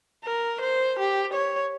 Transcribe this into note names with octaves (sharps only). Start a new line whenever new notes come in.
A#4
C5
G4
C#5